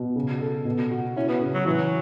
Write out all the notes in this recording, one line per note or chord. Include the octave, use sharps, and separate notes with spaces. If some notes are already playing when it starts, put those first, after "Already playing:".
Already playing: B2
C#3
A4
B2
F#4
C#4 E4
B3
C#3
F#3
E3 F#3